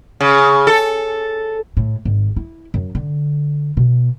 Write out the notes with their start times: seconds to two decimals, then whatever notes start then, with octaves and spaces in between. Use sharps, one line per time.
0.21 C#3
0.67 A4
1.77 A2
2.05 G#1
2.36 E4
2.74 F#2
2.95 D3
3.77 B2